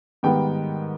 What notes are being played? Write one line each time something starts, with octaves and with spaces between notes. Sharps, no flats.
G#2 D#3 G3 B3 G5